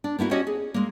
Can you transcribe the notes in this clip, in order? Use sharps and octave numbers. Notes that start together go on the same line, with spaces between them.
D4
A#3 B3 E4 F#4
C#4 F#4 G4 C#5 D#5
G#4
G#3 A#3